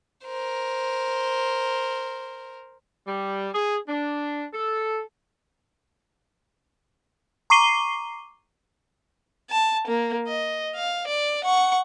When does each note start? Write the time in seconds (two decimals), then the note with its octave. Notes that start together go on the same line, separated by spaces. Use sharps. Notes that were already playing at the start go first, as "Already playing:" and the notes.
0.25 A#4 C5
3.07 G3
3.54 G#4
3.88 D4
4.54 A4
7.50 A#5 C#6 D6 C7 D#7 G7
9.50 A5
9.87 A#3
10.27 D#5
10.75 F5
11.07 D5
11.44 F#5 C#6